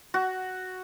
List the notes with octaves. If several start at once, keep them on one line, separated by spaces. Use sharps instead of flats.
F#4